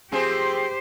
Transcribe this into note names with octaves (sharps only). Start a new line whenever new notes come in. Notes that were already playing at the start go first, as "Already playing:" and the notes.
F3 C4 G4 G#4 C5